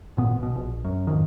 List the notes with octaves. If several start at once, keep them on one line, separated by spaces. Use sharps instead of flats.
G#1 A#2 B3
B1 B2
A#1
F#2
G#1 F2 D#3